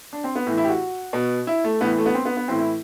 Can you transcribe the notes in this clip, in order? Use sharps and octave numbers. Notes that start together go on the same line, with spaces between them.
D4
C4
B3
A2 E3
E4
G4
F#4
B2
E4
A3
A2 E3 B3
A3
B3
C4
B3
B3
A2 E3 C4
E4